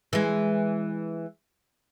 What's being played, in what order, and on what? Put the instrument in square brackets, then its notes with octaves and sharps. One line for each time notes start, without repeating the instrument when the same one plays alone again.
[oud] E3 G#3